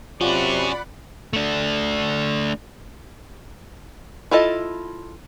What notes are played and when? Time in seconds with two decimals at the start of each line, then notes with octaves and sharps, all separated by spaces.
0.21 C3 C#4 F4 F#4 D5 F#5 B5
1.33 A3 D4
4.31 E4 F4 A4 D#5